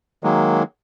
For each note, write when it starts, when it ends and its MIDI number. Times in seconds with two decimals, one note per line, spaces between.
0.24 0.63 51
0.24 0.63 54
0.24 0.63 56
0.24 0.63 58